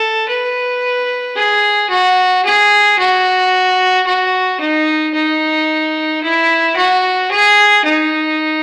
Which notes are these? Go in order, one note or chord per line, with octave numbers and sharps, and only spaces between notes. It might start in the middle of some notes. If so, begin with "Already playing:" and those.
Already playing: A4
B4
G#4
F#4
G#4
F#4
F#4
D#4
D#4
E4
F#4
G#4
D#4